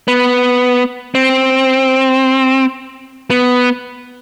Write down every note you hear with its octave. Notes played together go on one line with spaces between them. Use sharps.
B3
C4
B3